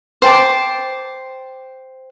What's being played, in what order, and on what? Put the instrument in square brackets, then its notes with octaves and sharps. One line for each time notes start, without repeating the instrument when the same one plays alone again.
[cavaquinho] C5 G5 A5 D6